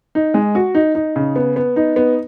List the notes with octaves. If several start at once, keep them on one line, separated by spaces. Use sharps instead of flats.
D#4
G#3
F#4
D#4
D#4
C#3
B3
B3
D#4
B3